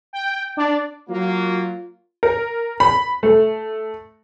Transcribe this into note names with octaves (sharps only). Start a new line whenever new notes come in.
G5
D4
F#3 A#3 F4
A#4
B5
A3